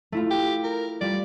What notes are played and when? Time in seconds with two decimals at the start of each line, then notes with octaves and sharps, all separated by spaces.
0.12 A3 E4 F4
0.30 G4
0.64 A#4
1.01 G3 F4 G4 D5